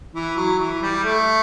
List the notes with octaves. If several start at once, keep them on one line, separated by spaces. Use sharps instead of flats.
E3
F#3
E3
G3
A3